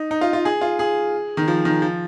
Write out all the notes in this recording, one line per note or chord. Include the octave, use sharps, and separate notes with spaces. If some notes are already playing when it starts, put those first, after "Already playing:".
Already playing: D#4
D#4
F4
F4
G#4
F4
G#4
D#3
F3
D#3
F3